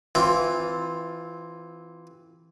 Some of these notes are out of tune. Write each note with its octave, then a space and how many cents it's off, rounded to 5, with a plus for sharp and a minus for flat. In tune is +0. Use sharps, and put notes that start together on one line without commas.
E3 +0 C4 +0 F4 +20